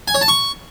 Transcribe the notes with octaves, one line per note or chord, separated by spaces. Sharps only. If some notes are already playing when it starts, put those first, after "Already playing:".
G#5
C#5
A5
C#6